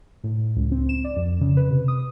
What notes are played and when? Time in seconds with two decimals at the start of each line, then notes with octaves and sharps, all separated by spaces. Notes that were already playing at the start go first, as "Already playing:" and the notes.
0.24 A2
0.56 C#2
0.72 C4
0.89 E7
1.04 D5
1.16 F2
1.41 C#3
1.57 B4
1.71 C3
1.88 D#6